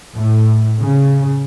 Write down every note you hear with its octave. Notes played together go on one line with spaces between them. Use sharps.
A2
C#3